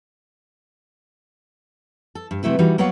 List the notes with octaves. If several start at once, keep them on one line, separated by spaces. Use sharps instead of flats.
A4
G2
C3 F#3 A3 E4 B4
E3 G3 D#4 F#4
F#3 A#3 B3 C#5 F5 F#5